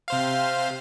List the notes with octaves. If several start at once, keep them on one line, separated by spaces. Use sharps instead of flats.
C3 C5 F5